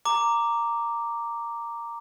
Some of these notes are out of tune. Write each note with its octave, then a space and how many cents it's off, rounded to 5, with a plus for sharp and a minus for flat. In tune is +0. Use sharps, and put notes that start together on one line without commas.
A#5 -5 D6 +0